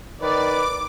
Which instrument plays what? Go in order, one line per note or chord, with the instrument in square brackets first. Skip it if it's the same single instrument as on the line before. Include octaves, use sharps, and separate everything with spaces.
[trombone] D#3 [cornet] B4 [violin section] D5 [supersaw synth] D6